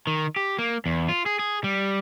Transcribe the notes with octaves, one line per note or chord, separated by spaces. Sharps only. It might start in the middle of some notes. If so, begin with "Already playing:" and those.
D#3
G4
A#3
E2
F4
G#4
G#4
G3